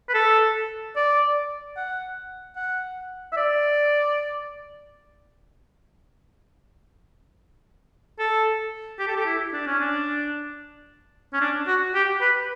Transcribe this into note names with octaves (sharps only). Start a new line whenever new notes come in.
B4
A4
D5
F#5
F#5
E5
D5
A4
G4
A4
G4
E4
D4
C#4
D4
C#4
D4
F#4
G4
B4